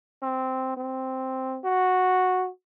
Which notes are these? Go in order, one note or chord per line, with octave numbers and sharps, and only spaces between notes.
C4
C4
F#4